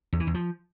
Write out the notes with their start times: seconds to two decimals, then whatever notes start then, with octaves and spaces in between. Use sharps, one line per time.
0.13 E2
0.20 E3
0.27 E2
0.34 F3